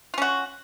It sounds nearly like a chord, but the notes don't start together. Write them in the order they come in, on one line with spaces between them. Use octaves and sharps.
F4 C#4 F#4